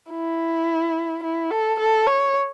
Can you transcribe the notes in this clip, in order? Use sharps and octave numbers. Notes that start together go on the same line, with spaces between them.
E4
E4
A4
A4
C#5